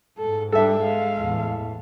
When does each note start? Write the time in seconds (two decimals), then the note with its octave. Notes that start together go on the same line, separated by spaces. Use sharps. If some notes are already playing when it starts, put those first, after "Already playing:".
0.18 G#2 A4
0.52 G3 D4 A4 E5
0.83 G#3 F5
1.18 E2 A2